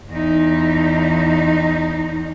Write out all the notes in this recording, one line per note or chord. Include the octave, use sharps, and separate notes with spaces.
E2 D#4